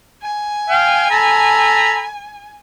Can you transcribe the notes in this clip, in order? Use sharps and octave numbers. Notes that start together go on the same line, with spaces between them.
G#5
F5 G5
A4 A#5 B5